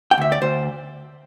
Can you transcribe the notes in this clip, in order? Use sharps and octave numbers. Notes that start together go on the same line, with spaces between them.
G5
D2 E5
D5
D2 C5